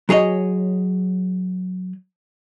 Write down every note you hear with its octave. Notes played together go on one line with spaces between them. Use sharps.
F#3 G#4 C#5 D#5